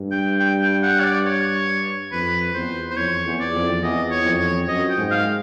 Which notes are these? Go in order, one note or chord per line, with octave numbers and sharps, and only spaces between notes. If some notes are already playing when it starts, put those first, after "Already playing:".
Already playing: G2
G5
G5
G5
F#5
C#5
D5
C#5
F2 B4
E2 C5
C5
F2 C#5
E2
D5
F2
E2 D#5
C#5
F2
C#5
F#2 D#5
G5
G#2
F5